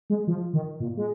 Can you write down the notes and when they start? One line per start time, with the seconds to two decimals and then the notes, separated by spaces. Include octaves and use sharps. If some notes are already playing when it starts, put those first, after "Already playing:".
0.10 G#3
0.27 F3
0.53 D#3
0.80 A#2
0.97 G#3